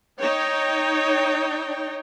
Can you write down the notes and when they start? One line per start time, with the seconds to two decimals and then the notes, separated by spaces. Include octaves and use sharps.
0.21 D#4 C#5 G5